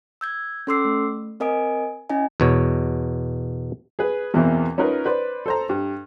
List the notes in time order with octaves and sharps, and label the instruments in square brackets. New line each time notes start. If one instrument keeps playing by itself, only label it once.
[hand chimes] E6 G6 G#6
C#4 A4 C6 D6 E6 C7
A3
C4 A#4 D#5 G#5 D#6 D7
C#4 E4 D#5 G#5
[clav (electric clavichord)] E2 B2 C#5
[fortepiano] G#4 B4
E2 B2 E3 A#3 C4
C#4 D#4 F4 A#4 B4
B4 C5 D5
A4 C5 A#5
G2